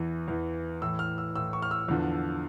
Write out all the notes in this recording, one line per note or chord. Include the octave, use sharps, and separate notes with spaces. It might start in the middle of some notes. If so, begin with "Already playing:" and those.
Already playing: E2 E3
E2 E3
A2 E3 E6
F6
E6
A2 E3 E6
C#6
F6
E6
E2 D3 F3